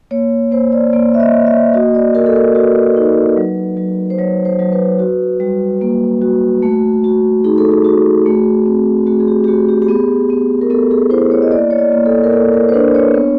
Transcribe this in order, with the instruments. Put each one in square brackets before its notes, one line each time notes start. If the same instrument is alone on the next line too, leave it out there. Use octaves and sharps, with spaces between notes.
[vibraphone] A#3 C#5
A#3 C5
D5
A#3 D5
E5
D#5
A#3
E5
F#4 D#5
D5
F#4 A#4
A4
A#4
F#4 B4
D#4
F#3
F#3
C5
F#3 C#5
C5
F#3
B4
F#4
G3
A#3
F#4
A3
F#4
D#4 G#4
A4
G#4
F#4
A3
C4
A3 F#4
G#4
G4
G4
A3 F#4
G4
G4
B3 G#4
B3
A#4
B3 A4
G#4
E4 C5
C#5
D#5
A#3 D5
C#5
D5
A#3
A4
A#4
A#3 A4
A#4
C5
D4 B4
C#5
B3